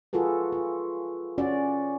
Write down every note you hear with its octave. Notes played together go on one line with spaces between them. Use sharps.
F4 F#4 G#4 A4 B4
F4
C#4 F#4 D5